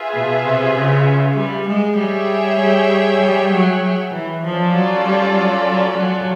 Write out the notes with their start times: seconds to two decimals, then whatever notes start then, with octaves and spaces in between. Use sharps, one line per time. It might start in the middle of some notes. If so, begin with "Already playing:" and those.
Already playing: F4 G#4 B4 E5
0.14 B2
0.45 C3
0.76 C#3
1.37 G3
1.68 G#3
1.98 G3 G#4 C#5 E5 G5
2.60 G3
3.22 G3
3.52 F#3
3.83 F#3
4.14 E3
4.44 F3 C#4 F4 A4 D5
4.74 F#3
5.05 G3
5.36 F#3
5.68 F#3
5.97 F#3